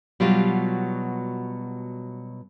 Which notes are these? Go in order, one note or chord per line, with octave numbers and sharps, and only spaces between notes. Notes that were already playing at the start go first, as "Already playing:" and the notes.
B2 F#3 G3 F4 G4